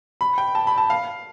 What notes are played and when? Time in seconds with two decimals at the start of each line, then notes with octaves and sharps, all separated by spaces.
0.21 B5
0.38 G5
0.55 A5
0.67 B5
0.78 A5
0.90 F5